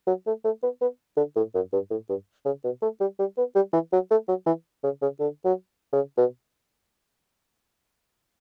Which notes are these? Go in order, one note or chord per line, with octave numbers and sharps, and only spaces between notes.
F#3
A3
A3
B3
B3
D3
A2
F#2
G2
A2
G2
C#3
B2
A3
G3
G3
B3
G3
E3
F#3
A3
F#3
E3
C#3
C#3
D3
F#3
C#3
B2